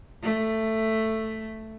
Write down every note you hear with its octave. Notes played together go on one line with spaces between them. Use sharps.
A3